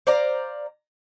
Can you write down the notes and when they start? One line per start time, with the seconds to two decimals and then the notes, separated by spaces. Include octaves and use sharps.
0.07 C5 D5 F5 A#5